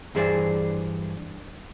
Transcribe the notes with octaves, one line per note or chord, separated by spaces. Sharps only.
G2 E3 G#4 C5 D5